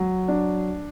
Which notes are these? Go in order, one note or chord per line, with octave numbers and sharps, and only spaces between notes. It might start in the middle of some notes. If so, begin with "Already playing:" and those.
Already playing: F#3
D4